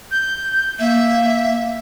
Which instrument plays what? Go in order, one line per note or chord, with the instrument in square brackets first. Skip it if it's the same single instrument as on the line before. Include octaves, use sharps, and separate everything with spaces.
[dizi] G6
[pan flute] A#3 [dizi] E5